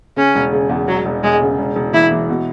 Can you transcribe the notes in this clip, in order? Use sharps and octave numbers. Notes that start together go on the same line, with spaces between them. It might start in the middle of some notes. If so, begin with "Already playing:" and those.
C#3 C#4
E1
C#3
E2
E1 F#3
E1
E1 G#3
C#3
E1
E1
E3 E4
E3
B2